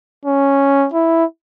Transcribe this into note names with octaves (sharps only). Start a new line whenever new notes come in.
C#4
E4